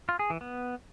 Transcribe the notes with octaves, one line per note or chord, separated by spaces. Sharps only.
F4
G#4
E3
B3